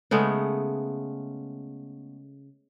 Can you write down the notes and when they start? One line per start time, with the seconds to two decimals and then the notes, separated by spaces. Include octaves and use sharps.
0.11 C#3 G#3 A3 B3